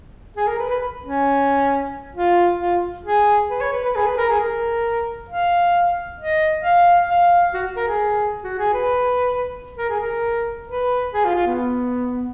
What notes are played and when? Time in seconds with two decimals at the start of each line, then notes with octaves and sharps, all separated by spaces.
0.36 G#4
0.47 A#4
0.59 B4
0.70 B4
1.03 C#4
2.15 F4
2.60 F4
3.05 G#4
3.50 B4
3.61 C#5
3.72 B4
3.84 B4
3.95 G#4
4.06 B4
4.17 A#4
4.29 G#4
4.40 A#4
5.30 F5
6.20 D#5
6.63 F5
7.10 F5
7.54 F#4
7.76 A#4
7.87 G#4
8.43 F#4
8.58 G#4
8.74 B4
9.78 A#4
9.89 G#4
10.00 A#4
10.68 B4
11.13 G#4
11.24 F4
11.35 F4
11.46 B3